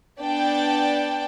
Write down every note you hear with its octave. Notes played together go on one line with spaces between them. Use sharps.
B3 D4 D5 G5